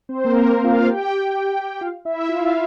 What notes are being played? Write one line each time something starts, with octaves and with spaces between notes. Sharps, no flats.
C4 C5
A#3 A#4
F4 F5
G4 G5
F4 F5
E4 E5
F4 F5